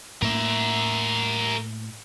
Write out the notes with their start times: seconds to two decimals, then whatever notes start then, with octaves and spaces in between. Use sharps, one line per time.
0.22 A2 A#3 A#4 E5